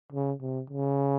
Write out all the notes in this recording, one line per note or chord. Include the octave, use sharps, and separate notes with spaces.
C#3
C3
C#3